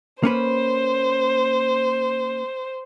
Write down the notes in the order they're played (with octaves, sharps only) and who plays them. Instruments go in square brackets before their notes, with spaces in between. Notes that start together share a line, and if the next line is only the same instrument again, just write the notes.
[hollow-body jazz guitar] A#3 C#4 B4 [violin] C5